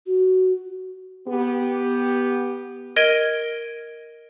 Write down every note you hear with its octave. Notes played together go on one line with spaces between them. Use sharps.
F#4
B3 G4
A#4 D#5 G#6 D7 D#7 G7